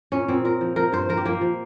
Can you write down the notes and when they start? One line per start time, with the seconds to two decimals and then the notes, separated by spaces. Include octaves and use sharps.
0.12 A#2 C#4
0.28 A#2 C4
0.45 A#2 A#4
0.61 F3
0.76 F3 A#4
0.92 G2 C5
1.09 F3 A#4
1.17 G4
1.25 F3 A#3
1.41 F3